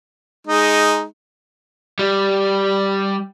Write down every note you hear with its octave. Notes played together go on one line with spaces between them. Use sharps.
G#3 D#4
G3